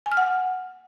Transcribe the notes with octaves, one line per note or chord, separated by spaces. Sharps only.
G#5
F6
F#5